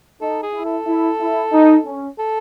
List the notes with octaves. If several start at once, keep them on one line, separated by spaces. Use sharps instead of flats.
D#4 A4
G#4
E4
A4
E4
E4
D#4
C#4
A4